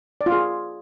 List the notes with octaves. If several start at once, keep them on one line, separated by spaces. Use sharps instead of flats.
D5
F4
G#4